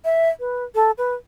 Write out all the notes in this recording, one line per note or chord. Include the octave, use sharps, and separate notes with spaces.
E5
B4
A4
B4